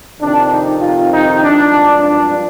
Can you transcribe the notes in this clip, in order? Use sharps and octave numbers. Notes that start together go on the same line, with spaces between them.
F2 C3 D#3 D4
D#4
F4
D#4
G#1 G2 F3 D4
D4